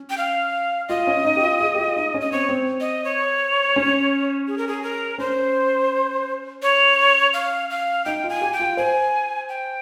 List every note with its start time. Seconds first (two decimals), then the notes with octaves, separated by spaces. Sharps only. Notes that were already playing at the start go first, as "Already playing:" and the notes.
Already playing: C#4
0.10 G5
0.18 F5
0.89 F4 D#5
1.07 C#4
1.25 D#4
1.37 G4
1.43 F4
1.60 G#4
1.74 G4
1.78 F4
1.96 D#4
2.14 C#4
2.21 D#5
2.32 C4 C#5
2.49 C4
2.80 D#5
3.05 C#5
3.76 C#4
4.48 G#4
4.58 A#4
4.68 G#4
4.83 A#4
5.18 C#4 C5
6.62 C#5
7.33 F5
7.70 F5
8.05 D#4 G5
8.24 F4
8.29 G#5
8.41 G4
8.53 G5
8.59 F4
8.77 C5 G#5
9.49 G5